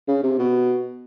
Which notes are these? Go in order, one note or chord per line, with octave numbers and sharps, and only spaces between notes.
C#3
C3
B2